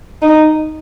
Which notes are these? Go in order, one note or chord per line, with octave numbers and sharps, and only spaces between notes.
D#4